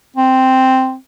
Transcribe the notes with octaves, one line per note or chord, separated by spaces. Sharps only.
C4